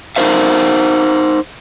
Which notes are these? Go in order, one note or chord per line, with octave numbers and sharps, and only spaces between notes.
D#4 G4 A#4 C5 E5 F5